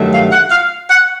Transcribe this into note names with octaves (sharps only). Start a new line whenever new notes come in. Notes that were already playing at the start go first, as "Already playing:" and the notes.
Already playing: G2 D#3 F#3 A3
F5
F#5
F5
F#5